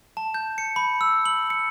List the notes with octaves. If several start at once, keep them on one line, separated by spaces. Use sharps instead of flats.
A5
G6
C#7
B5
E6
F#7
C#7